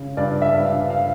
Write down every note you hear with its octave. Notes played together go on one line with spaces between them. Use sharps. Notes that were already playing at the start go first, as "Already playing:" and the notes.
Already playing: C#3
G2 D5
E5
G2
F5
F5